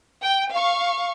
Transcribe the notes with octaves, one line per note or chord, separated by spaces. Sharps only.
G5
F5 C#6